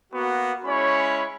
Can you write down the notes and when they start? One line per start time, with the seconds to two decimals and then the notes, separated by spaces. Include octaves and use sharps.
0.13 A#3 B3 F#4
0.65 G#3 C#4 E4 C#5 B5